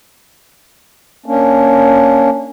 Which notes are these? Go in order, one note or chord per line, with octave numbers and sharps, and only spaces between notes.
A#3 C#4 D4